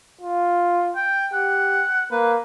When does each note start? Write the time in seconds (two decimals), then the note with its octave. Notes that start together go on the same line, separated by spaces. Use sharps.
0.21 F4
0.96 G5
1.33 G4 F#5
2.12 A#3 B4